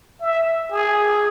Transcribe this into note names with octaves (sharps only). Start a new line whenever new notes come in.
E5
G#4